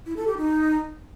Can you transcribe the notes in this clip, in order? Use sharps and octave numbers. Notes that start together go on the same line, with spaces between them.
E4
A4
G4
D#4